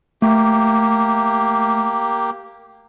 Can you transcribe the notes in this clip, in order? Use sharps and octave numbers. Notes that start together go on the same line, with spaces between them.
A3 A#3 G4